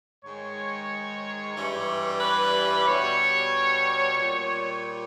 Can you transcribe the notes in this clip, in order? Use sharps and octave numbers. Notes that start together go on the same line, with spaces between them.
G#2 D#3 G#3 C#5
G2 E3 G3
B4
B2 G3 C#5
A#2 G3